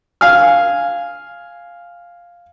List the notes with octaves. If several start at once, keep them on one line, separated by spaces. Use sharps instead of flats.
F5 G#5 F6